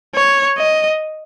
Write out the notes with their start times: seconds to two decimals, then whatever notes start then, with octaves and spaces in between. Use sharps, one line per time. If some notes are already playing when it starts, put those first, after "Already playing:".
0.15 C#5
0.57 D#5